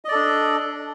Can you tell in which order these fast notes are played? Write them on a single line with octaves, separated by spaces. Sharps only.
D#5 D5 A4 D4